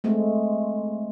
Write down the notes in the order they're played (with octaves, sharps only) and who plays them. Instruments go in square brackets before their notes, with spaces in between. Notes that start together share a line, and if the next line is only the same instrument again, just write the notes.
[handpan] G#3 A3 C4